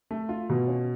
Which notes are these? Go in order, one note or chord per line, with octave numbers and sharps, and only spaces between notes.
A3
F4
B2
C#4